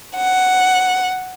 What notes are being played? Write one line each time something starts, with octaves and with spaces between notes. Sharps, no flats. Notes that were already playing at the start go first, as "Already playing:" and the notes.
F#5